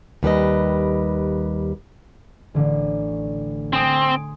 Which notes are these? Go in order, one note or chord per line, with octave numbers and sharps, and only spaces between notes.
D#2 G3 B4 D#5
A1 D3
C4 G#5 C6 D#6